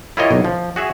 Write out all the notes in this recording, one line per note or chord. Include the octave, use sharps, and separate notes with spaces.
E4 F4 G4 A#4 C#5 D#5
B1
F3
F#4 G#4 E5